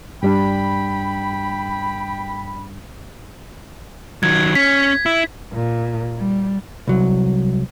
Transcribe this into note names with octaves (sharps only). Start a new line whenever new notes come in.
G2 G3 D4 G5 B5
D#3 F#3 G#6
C#4 B6
E4
A#2
G3
C2 F#3